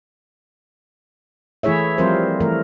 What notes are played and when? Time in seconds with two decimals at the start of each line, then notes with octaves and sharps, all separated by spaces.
1.63 E3 A3 E4 G#4 C#5 E5
1.98 F3 G3 C4 F4 A#4 C5
2.40 E3 A3 A#4